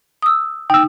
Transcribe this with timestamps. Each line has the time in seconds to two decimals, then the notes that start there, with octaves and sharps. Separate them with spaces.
0.22 D#6 E6
0.70 D#4 G5 E6